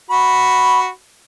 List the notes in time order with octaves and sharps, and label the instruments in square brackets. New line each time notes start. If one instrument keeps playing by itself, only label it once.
[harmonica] F#4 B5